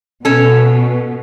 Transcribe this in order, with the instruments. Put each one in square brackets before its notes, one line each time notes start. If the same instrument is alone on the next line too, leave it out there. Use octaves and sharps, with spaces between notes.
[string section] B2 [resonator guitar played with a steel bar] C#4 A4